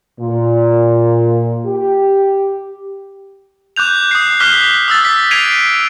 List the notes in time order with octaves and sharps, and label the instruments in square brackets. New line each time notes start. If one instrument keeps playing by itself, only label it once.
[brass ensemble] A#2
G4
[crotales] D6 F#6 G6 F7
D#6 F#6 C7
D6 F6 F#6 B6 G7
D#6 E6 A6
B6
G#6 B6 C7 D7 D#7 F7